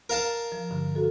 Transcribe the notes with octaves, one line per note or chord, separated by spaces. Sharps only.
A#4 F5 A5
F3
G2 D3
F#4 A4